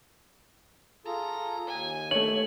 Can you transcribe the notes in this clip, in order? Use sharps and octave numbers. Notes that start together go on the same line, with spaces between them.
F4 G#4 A4 A#5
D#2 G#5
A3 C#5 F#7